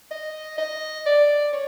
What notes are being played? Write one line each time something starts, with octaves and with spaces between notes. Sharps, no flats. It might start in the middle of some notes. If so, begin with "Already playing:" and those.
D#5
D#5
D5
C#5